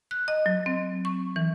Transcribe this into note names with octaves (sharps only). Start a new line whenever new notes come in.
F#6
D#5
F#3
C4
C#6
E3